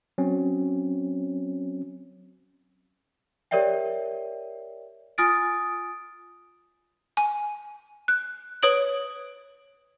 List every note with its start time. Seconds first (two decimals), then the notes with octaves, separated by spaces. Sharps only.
0.18 F#3 C4 C#4
3.51 G4 A#4 C#5 D5 E5 G5
5.18 F4 G#5 D#6 F6 A6 D7
7.17 G#5
8.08 F#6
8.63 B4 C#5 D#6 D7 F#7